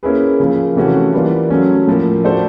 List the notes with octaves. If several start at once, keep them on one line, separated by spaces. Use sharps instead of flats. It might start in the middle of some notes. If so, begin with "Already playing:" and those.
A#3 C#4 E4 G#4 B4
C#3 F3 A#3
C3 E3 A3 C#4 F#4
E3 G3 A#3 D4 F4
F#3 A3 C#4
A2 F3 A#3
A3 D4 F#4 A4 C5